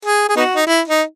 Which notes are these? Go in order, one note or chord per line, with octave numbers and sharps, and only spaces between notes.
G#4
G#4
B3 D#4 F#4
D#4
E4
D#4